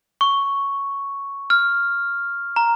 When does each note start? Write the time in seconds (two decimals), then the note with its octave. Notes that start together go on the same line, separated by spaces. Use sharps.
0.21 C#6
1.50 F6
2.56 A#5